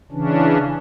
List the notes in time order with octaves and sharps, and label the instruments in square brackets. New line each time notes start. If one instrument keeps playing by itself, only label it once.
[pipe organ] C#3 E3 C#4 D4